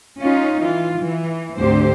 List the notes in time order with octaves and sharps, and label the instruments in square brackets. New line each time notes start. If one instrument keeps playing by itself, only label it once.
[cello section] C#4 D#4 F4
E3 F4
E3
D2 G#2 D3 C4 G4 C5